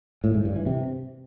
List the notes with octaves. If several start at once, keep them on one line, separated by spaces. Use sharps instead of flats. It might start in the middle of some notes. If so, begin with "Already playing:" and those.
A2
G#2
G2
E3
C3